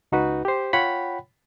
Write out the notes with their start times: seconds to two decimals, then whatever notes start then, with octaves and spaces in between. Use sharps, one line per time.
0.12 C#2 D#4 F#4 B4
0.45 G4 C5
0.73 F4 C#5 F#5 G5 B5